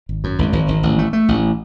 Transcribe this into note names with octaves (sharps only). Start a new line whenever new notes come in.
G#1
F#2
G#1
G#1
G#1
A1
A3
A3
A1